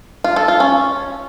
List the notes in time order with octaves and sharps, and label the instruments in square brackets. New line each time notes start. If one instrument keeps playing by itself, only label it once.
[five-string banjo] F4
A4
F4
C#4